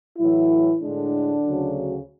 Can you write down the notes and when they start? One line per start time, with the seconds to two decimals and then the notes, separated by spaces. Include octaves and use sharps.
0.18 A2 E3 F#3 E4
0.82 A2 D3 G#3 D4
1.47 D2 C#3 F#3